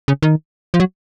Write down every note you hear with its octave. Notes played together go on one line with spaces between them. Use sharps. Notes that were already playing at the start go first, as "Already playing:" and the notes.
C#3
D#3
F3
F#3